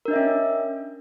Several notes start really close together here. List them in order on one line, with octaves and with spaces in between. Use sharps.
A#4 D4 D#5 E5 C#4